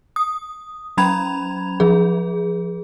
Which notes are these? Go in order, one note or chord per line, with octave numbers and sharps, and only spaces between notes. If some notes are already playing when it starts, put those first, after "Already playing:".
D#6
F#3 C#4 A#5 B5 G#6 F7
F3 G#4